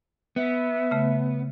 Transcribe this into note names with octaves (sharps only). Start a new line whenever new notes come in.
B3 E5
C#3 A3